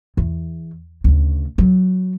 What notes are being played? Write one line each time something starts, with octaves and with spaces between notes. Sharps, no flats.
E2
D2 C#3
F#3